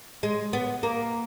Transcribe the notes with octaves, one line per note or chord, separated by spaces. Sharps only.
G#3
B3
A#3